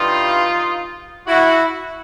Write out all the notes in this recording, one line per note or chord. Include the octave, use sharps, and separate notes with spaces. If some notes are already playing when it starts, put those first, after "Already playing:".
Already playing: G2 E3 G3 D#4 F4
E4 F#4